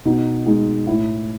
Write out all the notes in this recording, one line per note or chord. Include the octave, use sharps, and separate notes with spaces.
B2 D#4
G#3 D#4
A2 E4